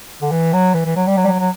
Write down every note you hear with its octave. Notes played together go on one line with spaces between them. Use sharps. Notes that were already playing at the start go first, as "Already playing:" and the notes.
D3
E3
F#3
E3
E3
F#3
G3
F#3
G3
F#3
F#3